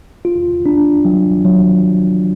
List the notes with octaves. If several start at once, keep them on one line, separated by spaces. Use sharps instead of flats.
F4
D4
F#3
F#3